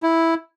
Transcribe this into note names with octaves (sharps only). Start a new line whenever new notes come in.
E4